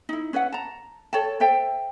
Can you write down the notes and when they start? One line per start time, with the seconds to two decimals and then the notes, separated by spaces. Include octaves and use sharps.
0.09 D#4 E4
0.33 C#4 B4 E5 F#5
0.52 A5 A#5
1.13 A4 C#5 G5 A5
1.40 A4 C5 E5 G5